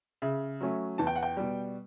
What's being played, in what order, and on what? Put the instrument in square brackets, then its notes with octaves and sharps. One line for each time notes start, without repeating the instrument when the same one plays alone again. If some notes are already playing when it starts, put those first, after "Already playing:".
[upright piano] C#3 E5
F#3 A3 C#4
E2 A5
G5
F#5
G5
B2 G3